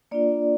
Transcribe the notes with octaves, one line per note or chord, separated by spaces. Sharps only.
A#3 D4 F4 D5